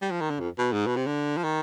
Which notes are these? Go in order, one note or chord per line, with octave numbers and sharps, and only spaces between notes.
G3
F3
D#3
D3
F2
B2
G#2
B2
C3
D3
F3
D#3